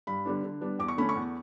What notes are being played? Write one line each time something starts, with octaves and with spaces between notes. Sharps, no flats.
G2 B5
D3 G3 B3 D4
D3
G3 B3 D4
E2 D6
C#6
D3 A3 C#4 B5
C#6
E2